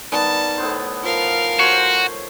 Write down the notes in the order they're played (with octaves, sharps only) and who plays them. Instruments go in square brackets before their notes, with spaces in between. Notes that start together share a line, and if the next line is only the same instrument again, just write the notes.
[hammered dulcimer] D#3 G3 B3 [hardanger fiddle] A5
[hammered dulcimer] A2 B3 C5
[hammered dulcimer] F3 [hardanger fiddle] A#4 F5
[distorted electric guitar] F#4 [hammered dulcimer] C5 C#5